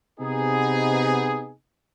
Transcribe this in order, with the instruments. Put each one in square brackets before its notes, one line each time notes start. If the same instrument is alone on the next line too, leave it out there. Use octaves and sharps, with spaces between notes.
[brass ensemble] C3 B3 D#4 G#4